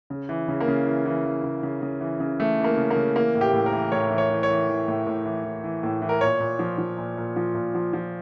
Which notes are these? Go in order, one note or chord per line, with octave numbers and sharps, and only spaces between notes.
C#3
E3
C#3
A#3
C#3
E3
E3
E3
C#3
C#3
C#3
E3
C#3
E3 A3
E3
A#3
C#3
A#3
C#3
E3 A#3
A2
G4
A2
A#4
E3
A2 C#5
E3
C#5
E3
C#5
E3
E3
A2
A2
E3
E3
E3
A2
E3
A#4
A#2 C#5
A#2
F3
F3
A#2
A#2
F3
A#2
F3
F3